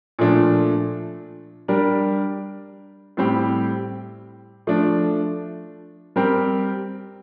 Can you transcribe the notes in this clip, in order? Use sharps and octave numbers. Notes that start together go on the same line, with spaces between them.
A#2 F3 A3 D4
G3 D4 G4 A#4
A2 G3 C4 G4
F3 A3 D4
G3 C4 G4 A#4